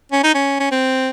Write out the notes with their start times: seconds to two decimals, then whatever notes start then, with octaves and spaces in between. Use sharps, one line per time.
0.12 C#4
0.23 D#4
0.34 C#4
0.60 C#4
0.71 C4